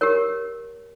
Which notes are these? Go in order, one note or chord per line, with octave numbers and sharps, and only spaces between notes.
G4 A#4 C#5